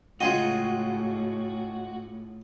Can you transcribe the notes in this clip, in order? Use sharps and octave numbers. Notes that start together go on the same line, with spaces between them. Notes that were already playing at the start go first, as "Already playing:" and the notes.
A2 C#3 G#3 F4 F#4 G#4 D#5 G5